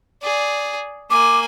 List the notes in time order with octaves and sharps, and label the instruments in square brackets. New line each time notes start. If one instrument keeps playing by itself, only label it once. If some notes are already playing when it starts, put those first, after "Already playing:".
[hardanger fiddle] G#4 D5
[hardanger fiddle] A#3 G#5 [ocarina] D6